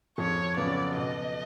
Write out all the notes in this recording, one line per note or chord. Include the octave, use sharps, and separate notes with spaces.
F2 C#5
C#3 F#3 B3 D5
B2 D#5